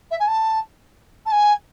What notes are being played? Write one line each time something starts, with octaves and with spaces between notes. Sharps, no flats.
E5
G#5
A5
A5
G#5